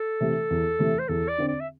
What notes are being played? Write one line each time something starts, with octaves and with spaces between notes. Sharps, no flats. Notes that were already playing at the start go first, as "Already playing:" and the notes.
Already playing: A4
C3 E3 A3
E2
C3 E3 A3
C5
E2 A4
D5
D3 C4
D5
E5